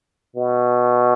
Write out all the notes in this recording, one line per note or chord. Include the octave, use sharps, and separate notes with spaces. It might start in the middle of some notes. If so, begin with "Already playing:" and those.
B2